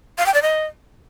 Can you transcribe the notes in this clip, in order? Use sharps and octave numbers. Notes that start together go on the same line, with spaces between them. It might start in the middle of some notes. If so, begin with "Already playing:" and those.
F5
G5
D5
D#5